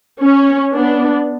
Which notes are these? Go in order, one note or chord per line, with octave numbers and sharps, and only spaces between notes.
C#4
B3 D4